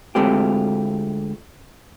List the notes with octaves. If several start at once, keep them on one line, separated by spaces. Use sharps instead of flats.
D2 G#3 A3 C4 F4 G4